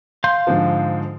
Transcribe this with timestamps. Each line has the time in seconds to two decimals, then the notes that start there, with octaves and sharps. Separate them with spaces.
0.24 F5 C6 G6
0.47 G#2 D3 F3